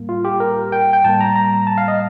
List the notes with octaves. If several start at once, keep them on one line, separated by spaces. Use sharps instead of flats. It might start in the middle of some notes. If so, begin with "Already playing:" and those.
Already playing: A2 G3 A#3
F4
G4
A#4
G5
G5
A2 G3 A#3 A5
A#5
A#5
A5
F5
D#5